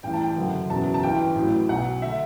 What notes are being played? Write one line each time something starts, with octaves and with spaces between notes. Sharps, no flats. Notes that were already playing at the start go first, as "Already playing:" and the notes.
A1 G2 E3 G5
A5
G5
F#1 F#2 D3
F#1 E2 B2 F#3 A5
A5
G1 G2 E3 G5
A1 A2 F#3
B1 B2 F#3 F#5
D3 E5